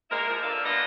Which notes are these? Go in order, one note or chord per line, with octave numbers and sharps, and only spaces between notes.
G#3 A#3 E4 A#4
F3 A#4
G2 D3 D5 E5 F5
G3 A#3 B3 D4 F4 D#5